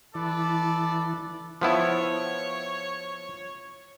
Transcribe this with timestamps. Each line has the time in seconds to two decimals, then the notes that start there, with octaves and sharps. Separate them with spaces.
0.15 E3 A4 B4 D5
1.61 F3 B3 E4 C#5